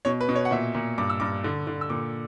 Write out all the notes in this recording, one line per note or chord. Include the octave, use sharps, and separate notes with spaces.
B2 C#5
B4
B2
C#5
F#5
A#2 E5
A#2
G2 D6
E6
G2 D6
D3
D3
E6
A#2 D6